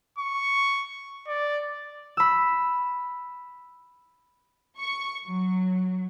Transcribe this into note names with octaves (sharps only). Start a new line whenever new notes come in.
C#6
D5
B5 E6
C#6
F#3